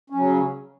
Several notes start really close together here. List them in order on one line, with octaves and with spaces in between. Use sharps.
C#4 F#3 C#3